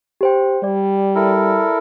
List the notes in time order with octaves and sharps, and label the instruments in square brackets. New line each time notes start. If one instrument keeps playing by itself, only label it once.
[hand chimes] G4 C5 G5
[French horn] G3 [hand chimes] D5
[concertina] E4 A4 A#4